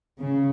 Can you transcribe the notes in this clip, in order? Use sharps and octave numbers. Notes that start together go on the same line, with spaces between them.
C#3